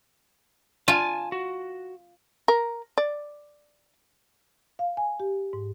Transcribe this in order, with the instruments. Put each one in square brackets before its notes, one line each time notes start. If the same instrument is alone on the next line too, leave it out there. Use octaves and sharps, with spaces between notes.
[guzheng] F4 [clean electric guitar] G#5 A5
[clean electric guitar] F#4
[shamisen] A#4
D5
[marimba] F5
G#5
G4
G#2